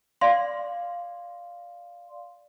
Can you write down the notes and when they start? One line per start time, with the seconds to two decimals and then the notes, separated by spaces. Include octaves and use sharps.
0.21 D5 F5 C6